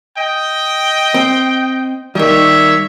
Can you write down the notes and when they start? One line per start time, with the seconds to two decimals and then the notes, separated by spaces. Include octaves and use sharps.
0.15 D#5 G5
1.14 C4
2.15 D#3 G3 A#3 C#5 E5